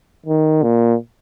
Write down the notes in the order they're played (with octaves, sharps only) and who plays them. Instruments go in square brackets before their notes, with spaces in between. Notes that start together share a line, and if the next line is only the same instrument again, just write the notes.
[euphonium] D#3
A#2